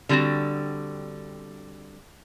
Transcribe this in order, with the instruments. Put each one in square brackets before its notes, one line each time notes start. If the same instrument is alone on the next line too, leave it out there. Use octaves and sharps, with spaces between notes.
[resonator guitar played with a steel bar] D3 G3 C4 F4 F#4